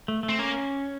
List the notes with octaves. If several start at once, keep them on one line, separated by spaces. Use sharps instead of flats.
A3
A3
C4
A#3 C#4